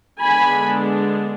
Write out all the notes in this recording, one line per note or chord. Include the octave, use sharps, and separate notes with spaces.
D3 G#3 B3 D4 G#5 B5